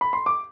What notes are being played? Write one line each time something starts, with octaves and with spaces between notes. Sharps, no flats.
B5
C6
D6